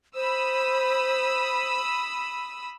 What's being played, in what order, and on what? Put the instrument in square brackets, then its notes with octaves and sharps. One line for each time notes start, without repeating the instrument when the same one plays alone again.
[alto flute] C5 [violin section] B5 D#6 E6